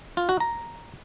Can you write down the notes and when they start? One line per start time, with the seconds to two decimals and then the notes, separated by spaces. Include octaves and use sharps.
0.17 F4
0.29 F#4
0.40 A#5